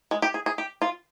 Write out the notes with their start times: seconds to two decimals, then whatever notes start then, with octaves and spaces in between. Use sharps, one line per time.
0.11 G#3
0.22 G4
0.34 G#4
0.46 G#4
0.58 G4
0.82 F4